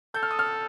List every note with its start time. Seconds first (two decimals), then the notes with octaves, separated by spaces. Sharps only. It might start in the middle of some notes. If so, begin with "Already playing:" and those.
0.14 A4 G6
0.23 F6
0.31 D#6
0.39 F6